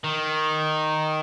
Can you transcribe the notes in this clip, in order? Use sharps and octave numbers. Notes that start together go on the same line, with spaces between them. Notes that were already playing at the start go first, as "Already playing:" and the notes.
D#3